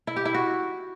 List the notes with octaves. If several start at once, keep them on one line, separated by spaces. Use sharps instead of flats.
E4
G4
E4
F#4